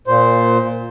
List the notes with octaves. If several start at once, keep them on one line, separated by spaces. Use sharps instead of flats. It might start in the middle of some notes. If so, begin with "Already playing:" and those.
A#2 C5